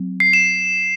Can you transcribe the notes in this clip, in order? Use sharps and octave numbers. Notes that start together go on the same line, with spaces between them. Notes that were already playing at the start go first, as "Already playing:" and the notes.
Already playing: F#3 C4
C7
E7